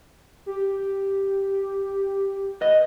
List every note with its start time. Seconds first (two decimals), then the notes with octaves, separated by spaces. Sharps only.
0.46 G4
2.61 B4 D#5